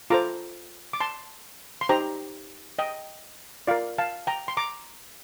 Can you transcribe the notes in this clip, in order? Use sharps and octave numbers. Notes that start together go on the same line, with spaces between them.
F4 A4 C5 A#5 D6
D6
A5 C6
C6
D#4 G4 C5 G5 A#5
D#5 G5
F4 A#4 D5 F5
F5 A5
G5 A#5
C6
A#5 D6